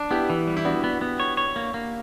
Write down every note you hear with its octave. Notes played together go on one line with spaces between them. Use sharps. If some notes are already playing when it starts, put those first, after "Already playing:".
Already playing: D4
B3 E4 G4
E3
G3
E4
B3 D4 F#4
B3
B3
C#5
C#5
A#3
A#3